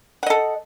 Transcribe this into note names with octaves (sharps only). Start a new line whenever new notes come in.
A4 D#5 F#5